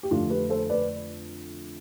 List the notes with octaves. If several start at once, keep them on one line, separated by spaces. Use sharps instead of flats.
G4
F2 D3 A3 D4 F4
G4 B4
A4 C5
B4 D5